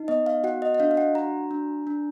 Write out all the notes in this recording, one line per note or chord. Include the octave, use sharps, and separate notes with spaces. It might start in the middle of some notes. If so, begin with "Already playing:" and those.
Already playing: D#4
B3 D#5
F5
F#4 F#5
D#5
D#5
D4 F5
F5
F#5
F#4 A#5
D4
D4